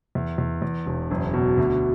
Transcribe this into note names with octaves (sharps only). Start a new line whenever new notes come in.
E2
E2
E2
E1
F#1
B2
D2